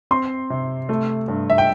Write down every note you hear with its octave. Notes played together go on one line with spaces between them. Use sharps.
C4 C6
C3
A3
G2
E5
G5